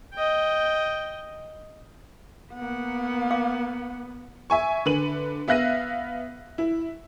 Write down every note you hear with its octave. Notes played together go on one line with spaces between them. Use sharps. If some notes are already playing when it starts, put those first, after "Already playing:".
D#5 G5
A#3 B3 F#5
F5 D6
E5 G#5 C#6
D3 B4 D#7 F#7
B3 E5 F5 F#6 A#6 D#7
E4